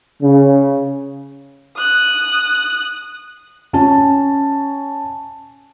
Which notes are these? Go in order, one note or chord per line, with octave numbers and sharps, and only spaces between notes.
C#3
D#6 F#6
C#4 A5